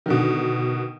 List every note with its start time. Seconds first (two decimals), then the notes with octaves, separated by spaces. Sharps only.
0.06 B2 D3 D#3